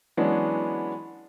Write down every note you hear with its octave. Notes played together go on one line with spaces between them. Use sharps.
E3 F#3 G#3 B3 C#4 D4